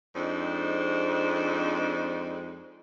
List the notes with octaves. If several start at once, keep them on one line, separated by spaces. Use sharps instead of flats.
F2 G#3 C4 D4 D#4